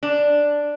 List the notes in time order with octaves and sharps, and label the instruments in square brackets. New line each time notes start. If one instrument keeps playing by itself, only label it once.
[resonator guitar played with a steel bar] D4